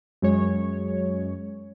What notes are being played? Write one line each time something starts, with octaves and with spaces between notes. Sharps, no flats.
F#2 G#3 C#5